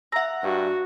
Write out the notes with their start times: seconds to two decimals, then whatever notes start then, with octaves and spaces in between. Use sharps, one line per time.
0.12 E5 F#5 A#5 E6
0.43 G2 F#4